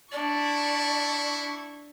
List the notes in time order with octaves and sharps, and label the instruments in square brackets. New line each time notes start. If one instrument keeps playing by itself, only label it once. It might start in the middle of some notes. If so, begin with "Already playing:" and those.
[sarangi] D4 [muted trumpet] E4 [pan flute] D5 [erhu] C#6